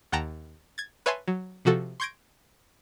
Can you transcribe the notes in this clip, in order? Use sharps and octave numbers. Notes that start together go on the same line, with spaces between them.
D#2 F#5 G5 A5 A#5 A#6
G#6 A6
B4 C#5 E5 G#5 A5 C6
F#3
C3 F3 F#4 A4
C6 C#6 G6 G#6 A#6 D7